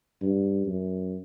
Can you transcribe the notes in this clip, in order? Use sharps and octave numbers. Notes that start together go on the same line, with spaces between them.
G2
F#2